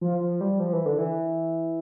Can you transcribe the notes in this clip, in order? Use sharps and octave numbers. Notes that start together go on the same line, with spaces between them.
F3
F3
G3
F3
E3
D3
E3